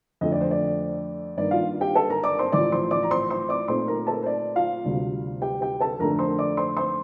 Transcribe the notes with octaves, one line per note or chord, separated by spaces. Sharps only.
F2 D3 A3 D#5
D5
C5
D5
G2 D#3 A#3 D5
F4 F5
G4 G5
A4 A5
A#4 A#5
D5 D6
C5 C6
A1 A2 F3 D5 D6
C5 C6
D5 D6
A#5
C5 C6
C5 C6
D5 D6
A#2 A3 C4 D#4 C5 C6
A#4 A#5
A4 A5
C5
D5
F4 F5
D2 C3 G3 C4
G4 G5
G4 G5
A4 A5
F2 D3 A3 D4 A#4 A#5
C5 C6
D5 D6
C5 C6
C5 C6